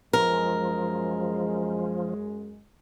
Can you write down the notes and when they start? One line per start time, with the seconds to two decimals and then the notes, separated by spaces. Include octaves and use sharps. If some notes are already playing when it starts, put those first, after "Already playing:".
0.13 F#2 F3 G#3 A#4